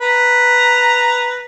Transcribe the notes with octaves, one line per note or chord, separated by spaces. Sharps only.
B4 A#5